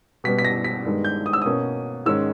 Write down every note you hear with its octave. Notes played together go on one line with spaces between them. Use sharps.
B2 G3 B3 B6
B6
A#6
B6
G2 D#3 G#3 B3
G6
D#6
E6
B2 A#3 C#4 D#6
G#2 D#3 G#3 C#4 E6